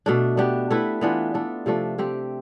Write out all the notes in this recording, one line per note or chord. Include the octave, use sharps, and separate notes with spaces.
B2 A3 D4
B3 D4 G4
A3 E4 B4
E3 B3 D4 F4
A3 D4 A4
C3 F3 A3 D4
A3 C4 G4